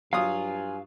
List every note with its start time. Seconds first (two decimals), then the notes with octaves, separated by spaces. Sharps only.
0.13 G2 F#3 F4 F5 G#5 D#6